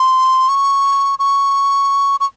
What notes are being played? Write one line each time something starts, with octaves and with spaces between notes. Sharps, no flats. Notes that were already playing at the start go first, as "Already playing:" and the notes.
Already playing: C6
C#6
C#6
C#6